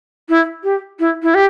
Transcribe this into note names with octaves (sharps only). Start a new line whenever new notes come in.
E4
G4
E4
E4
G4